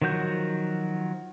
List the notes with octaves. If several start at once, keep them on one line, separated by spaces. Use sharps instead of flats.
D#3 F3 F#3 F#4 G6